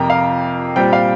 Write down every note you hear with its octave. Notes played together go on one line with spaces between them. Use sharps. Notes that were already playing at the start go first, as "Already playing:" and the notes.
Already playing: F2 C3 A#3 G5 A#5
F5
A#2 G3 C4 G5
F5